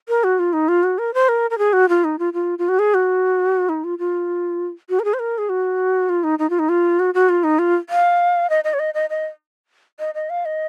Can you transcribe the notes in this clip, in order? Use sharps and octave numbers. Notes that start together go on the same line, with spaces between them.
A#4
F#4
F4
D#4
F4
F#4
A#4
C5
A#4
A#4
G#4
F#4
F4
D#4
F4
F4
F4
F#4
G#4
F#4
D#4
F4
F4
F#4
A#4
G#4
C5
A#4
G#4
F#4
F4
D#4
D#4
F4
D#4
F4
F#4
F#4
F4
D#4
F4
F5
D#5
D#5
C#5
D#5
D#5
D#5
D#5
D#5
F5
D#5